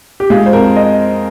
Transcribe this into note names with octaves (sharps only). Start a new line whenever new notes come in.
G4
G#3 F4
C5
F2 A#4
D#5